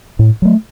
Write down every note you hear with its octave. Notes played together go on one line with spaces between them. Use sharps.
A2
F#3 A3